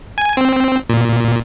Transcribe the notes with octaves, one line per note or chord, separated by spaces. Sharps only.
G#5
C4
A#2